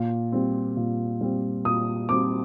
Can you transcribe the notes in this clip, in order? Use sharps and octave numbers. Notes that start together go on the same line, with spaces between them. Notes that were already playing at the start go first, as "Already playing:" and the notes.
Already playing: A#2
G3 C4
A#2
G3 C4
A#2 D#6
G3 C4 D6